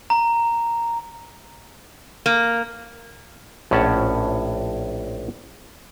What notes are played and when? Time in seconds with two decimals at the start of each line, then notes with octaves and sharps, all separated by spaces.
0.10 A#5
2.26 A#3
3.71 A#1 A2 C#4 F#5 A5